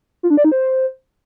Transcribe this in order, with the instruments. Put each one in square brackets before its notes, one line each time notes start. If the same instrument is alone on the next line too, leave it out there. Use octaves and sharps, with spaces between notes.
[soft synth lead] F4
D4
D5
D#4
C5